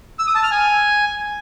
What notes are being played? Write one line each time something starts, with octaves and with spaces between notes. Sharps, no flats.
E6
D#6
A5
F6
G#5